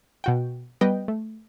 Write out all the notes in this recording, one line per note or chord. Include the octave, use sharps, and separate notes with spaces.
B2 F#4 G5
G3 B3 B4 D#5 G5
A3